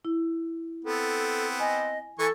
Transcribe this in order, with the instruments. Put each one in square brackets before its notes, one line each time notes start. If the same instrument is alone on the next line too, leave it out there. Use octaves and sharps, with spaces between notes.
[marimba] E4
[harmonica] B3 C4 [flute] A4
[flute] D#5 [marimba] G#5
[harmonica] E3 G#5 C#6 [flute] A4